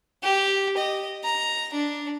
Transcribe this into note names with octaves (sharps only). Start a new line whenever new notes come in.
G4
D#5
A#5
D4